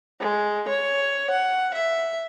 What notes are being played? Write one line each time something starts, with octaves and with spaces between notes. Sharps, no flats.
G#3
C#5
F#5
E5